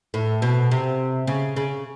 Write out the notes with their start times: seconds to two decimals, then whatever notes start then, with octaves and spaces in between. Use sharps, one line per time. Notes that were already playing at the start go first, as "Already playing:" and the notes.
0.14 A2
0.42 B2
0.71 C3
1.27 C#3
1.56 C#3